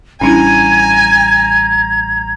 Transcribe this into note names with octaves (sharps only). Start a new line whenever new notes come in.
A1 G3 C#4 D4 E4 G#5 A#5 G#6